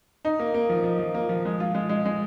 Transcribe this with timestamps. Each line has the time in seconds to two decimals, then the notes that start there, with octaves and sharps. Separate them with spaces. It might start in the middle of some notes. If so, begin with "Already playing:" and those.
0.25 D#4
0.39 A#3
0.54 A#3
0.70 F3
0.84 F3
0.99 F3
1.14 A#3
1.29 F3
1.45 G#3
1.60 F4
1.74 G#3
1.89 G#3
2.05 G#3